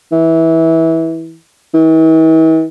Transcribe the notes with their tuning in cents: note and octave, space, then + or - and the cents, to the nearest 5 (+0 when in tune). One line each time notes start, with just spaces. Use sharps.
E3 -20
E3 -45